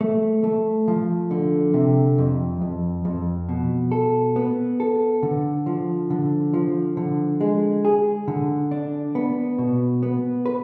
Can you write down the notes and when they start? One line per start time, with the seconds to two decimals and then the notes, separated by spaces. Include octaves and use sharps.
0.01 A3
0.44 A3
0.88 F3
1.31 D3
1.74 C3
2.18 F2
2.62 F2
3.05 F2
3.49 B2
3.92 A4
4.36 B3
4.80 A4
5.23 D3
5.66 F3
6.10 D3
6.53 F3
6.97 D3
7.41 G#3
7.85 G#4
8.28 D3
8.71 D4
9.15 B3
9.58 B2
10.03 B3
10.46 B4